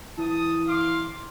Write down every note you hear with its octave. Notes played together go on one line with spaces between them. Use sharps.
E3 A5 D#6
F5 C6 D6